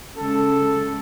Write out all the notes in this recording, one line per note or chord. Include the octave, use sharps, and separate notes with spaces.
C#3 G#3 A4